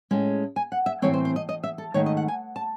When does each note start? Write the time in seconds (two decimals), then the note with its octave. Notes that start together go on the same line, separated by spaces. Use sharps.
0.11 A2 G#3 C#4
0.56 G#5
0.72 F#5
0.86 E5
1.02 A2 E3 G#3 C4 C#5
1.14 C5
1.25 C5
1.36 D#5
1.49 D#5
1.64 E5
1.78 A4
1.94 G#2 D#3 A3 C#5
2.06 D#5
2.17 F#5
2.28 G#5
2.56 A5